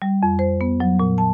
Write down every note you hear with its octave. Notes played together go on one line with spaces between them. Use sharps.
G3
F2
C5
B3
F#3
A#2
A5